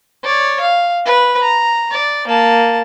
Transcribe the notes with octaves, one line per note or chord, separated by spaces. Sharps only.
C#5 D5
F5
B4
A#5
D5
A#3 A5